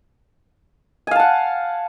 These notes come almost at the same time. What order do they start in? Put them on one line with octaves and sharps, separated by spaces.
G#5 F5 A5 F#5